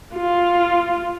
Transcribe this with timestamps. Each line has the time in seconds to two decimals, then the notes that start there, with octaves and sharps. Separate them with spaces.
0.16 F4